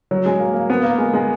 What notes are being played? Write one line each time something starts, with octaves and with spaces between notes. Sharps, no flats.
F#3
G#3
A#3
A#3
B3
A#3
G#3
G#3